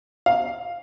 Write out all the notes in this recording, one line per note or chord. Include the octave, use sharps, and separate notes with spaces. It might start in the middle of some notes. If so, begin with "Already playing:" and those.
F5